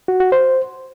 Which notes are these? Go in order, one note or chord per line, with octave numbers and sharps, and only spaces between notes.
F#4
F#4
C5